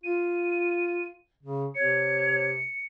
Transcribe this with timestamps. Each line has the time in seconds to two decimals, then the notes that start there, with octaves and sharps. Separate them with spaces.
0.04 F4 D#7
1.43 C#3
1.75 C3 C#5 C#7